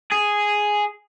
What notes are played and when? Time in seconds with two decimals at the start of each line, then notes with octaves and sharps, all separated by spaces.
0.12 G#4